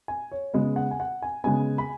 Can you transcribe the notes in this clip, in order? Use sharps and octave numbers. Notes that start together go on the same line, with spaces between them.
G#5
C#5
C#3 G#3 B3 D#5
F#5
G#5
F#5
G#5
C#3 G#3 B3 G#5
B5